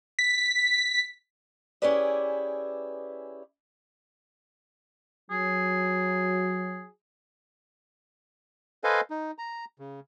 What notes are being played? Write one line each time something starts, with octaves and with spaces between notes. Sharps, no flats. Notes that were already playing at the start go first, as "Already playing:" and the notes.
B6
C#4 E4 G4 G#4 B4 D5
F#3 G#4
A4 B4 C5 D#5 F5 G#5
D#4
A#5
C#3